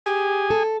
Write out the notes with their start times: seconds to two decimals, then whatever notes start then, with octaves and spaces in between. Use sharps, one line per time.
0.06 G4 G#4 G#5
0.50 A4